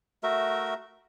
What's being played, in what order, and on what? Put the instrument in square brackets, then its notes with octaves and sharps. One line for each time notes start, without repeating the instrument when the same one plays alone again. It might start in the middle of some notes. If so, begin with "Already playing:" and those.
[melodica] A3 F#4 A#4 E5